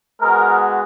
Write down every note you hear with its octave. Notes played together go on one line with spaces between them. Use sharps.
G#3 B3 F#4 A#4